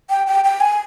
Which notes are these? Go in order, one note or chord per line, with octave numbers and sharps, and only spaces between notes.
G5
G5
G5
G#5